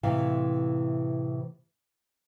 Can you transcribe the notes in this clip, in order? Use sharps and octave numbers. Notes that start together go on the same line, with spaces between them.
A2 C3 E3 F5